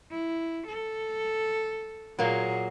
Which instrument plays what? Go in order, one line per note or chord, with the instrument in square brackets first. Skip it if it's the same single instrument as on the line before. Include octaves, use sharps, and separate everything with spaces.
[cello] E4
A4
[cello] A#2 G#4 [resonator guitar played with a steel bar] F#3 A#3